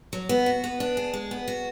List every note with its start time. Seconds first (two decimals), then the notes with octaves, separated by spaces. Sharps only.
0.13 F#3
0.29 B3
0.46 F#4
0.64 B3
0.80 D4
0.97 G#4
1.14 G#3
1.31 B3
1.48 F#4